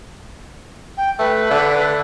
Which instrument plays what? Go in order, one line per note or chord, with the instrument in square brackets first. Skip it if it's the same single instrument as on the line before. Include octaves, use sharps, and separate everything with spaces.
[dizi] G5
[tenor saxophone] A3 [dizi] B4
[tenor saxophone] D3